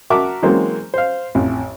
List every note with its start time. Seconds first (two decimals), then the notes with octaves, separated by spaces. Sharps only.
0.10 F#4 A#4 E5 A5 D6
0.42 E3 F#3 G#3 A#3 C4
0.94 C5 F5
1.35 A1 F2